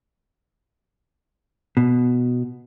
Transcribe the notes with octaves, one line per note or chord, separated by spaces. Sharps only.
B2